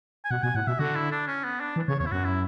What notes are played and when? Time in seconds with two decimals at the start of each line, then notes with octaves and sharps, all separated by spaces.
0.25 G#5
0.31 B2 F#5
0.43 B2 G#5
0.55 A2 F#5
0.67 B2 E5
0.79 D3 F#4
0.95 E4
1.11 D4
1.27 C#4
1.44 B3
1.60 D4
1.76 E3
1.88 C#3 C#5
2.00 E2 C#5
2.06 E4
2.12 F#2 F#4
2.25 E4